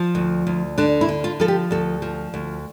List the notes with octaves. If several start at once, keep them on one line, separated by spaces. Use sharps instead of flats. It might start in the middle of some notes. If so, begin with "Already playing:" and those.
Already playing: F3
D2
D2
D3 D4
E4
D3
F4
F3 A4
G4
D2 A4
F3
D2